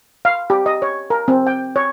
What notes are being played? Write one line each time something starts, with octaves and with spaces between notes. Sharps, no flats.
F5
G4
D#5
C#5
A#4
C4
G5
C#5